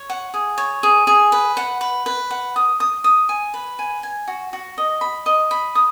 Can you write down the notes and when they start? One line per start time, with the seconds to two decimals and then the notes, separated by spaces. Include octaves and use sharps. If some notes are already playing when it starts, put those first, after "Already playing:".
Already playing: C#5
0.10 F#5
0.34 G#4
0.58 C#5
0.83 G#4
1.07 G#4
1.32 B4
1.57 F#5
1.81 B4
2.06 B4
2.31 F#5
2.56 D#6
2.80 D#6
3.04 D#6
3.29 G#5
3.54 B4
3.79 G#5
4.03 G#5
4.28 F#4
4.53 F#4
4.78 D#5
5.01 B5
5.26 D#5
5.51 B5
5.75 D#6